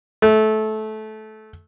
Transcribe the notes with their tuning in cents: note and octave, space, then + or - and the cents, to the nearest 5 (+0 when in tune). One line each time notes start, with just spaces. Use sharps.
A3 -20